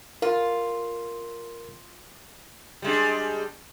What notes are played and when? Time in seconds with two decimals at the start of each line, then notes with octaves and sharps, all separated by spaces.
0.22 F4 A#4
2.82 G3 G#3 D4